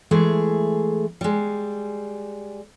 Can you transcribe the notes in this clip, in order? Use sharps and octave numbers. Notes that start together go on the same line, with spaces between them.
E3 G#3 A3 G#4
G3 G#3